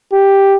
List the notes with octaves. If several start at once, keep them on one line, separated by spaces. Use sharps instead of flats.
G4